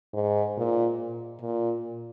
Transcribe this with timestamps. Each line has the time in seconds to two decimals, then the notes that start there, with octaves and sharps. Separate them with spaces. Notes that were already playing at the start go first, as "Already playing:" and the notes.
0.14 G#2
0.57 A#2
1.42 A#2